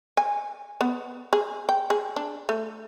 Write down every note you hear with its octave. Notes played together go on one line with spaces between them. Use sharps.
G#5
B3
G#4
G5
G#4
D4
A3